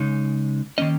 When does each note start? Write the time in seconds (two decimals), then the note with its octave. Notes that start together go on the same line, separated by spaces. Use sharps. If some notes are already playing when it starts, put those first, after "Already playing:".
Already playing: C#3 G#3 D#4
0.78 D#3 F#3 A#3 C#4 D#5